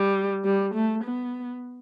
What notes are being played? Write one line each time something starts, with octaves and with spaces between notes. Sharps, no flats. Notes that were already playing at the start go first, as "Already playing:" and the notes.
Already playing: G3
G3
A3
B3